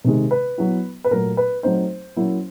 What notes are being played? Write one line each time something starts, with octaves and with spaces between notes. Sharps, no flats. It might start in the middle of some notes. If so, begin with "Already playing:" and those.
C3 D#3 G#3
B4
F#3 B3 E4
B4
A#2 F#3 A3 A#4
B4
F#3 A3 C4 D#4 C5
F#3 A#3 C#4 E4